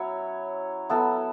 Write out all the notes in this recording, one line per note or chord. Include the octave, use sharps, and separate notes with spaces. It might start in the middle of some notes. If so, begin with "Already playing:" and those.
Already playing: F#3 C#4 E4 C#5
F#3 B3 E4 A4